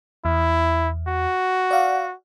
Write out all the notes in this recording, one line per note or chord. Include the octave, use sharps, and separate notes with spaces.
E2 E4
F#4
D5 F5 F#5